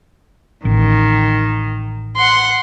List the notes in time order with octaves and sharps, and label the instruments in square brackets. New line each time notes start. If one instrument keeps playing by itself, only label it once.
[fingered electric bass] A1 [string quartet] D#3
[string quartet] F#5 C6